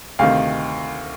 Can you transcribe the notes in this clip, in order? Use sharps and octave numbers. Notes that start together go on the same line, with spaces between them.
D2 C3 D#3 F5